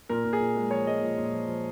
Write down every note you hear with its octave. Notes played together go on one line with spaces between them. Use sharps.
A#2 A#4
A#2
G#4
A#2
G#3
F3 C#5
G#3 D#5
A#2
A#2
F3
F3